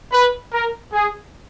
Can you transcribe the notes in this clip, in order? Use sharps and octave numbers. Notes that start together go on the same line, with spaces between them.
B4
A#4
G#4